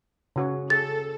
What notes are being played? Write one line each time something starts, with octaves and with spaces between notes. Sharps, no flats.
C#3 F#4 C#5
G#4 A4 A6